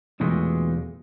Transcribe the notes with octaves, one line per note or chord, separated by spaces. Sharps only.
B1 E2 A#2 G#3 A3